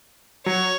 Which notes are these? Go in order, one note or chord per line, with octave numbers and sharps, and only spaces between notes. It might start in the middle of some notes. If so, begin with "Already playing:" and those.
F#3 C#5